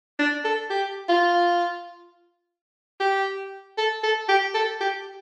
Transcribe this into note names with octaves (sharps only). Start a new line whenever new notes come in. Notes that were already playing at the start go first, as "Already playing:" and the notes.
D4
A4
G4
F4
G4
A4
A4
G4
A4
G4